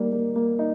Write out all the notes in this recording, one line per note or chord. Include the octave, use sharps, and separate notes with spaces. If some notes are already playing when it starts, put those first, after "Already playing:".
Already playing: G3 A#3 D#4
A#3
A#3
D#4